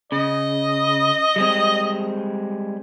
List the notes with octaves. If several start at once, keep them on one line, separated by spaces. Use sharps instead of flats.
C#3 D#5
G3 G#3 C4